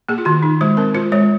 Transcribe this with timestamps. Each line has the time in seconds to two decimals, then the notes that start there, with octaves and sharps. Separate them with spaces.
0.09 A#3 G#4
0.18 F4
0.25 D#3 F#4
0.43 D#4
0.61 G#3 C5
0.77 C4 A#4
0.95 F4 C5
1.12 G#3 C#5